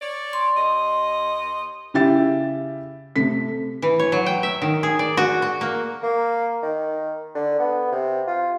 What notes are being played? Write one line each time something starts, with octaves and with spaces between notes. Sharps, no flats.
C#5 D5
C6
D#2 D#5
C#3 E4 G4 E5 A6
C3 A3 B6
E3
C#5
F#3
G5
E5
D#3
G#4
D5
F#4
F#4
A#3
A#3
D#3
D3
B3
C3
F4